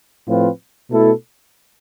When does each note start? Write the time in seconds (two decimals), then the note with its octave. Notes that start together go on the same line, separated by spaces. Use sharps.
0.27 A2 F3 C4 F4 B4
0.89 B2 A3 E4 A4